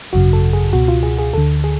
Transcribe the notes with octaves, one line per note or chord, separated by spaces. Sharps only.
G#1 F#2 C#3 F#4
A4
G#4
C#2 B2 F#4
F4
G#4
G#4
D2 D3 A4
G#4